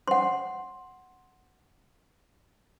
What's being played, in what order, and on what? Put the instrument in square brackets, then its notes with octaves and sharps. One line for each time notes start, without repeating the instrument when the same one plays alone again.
[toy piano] F#5 C6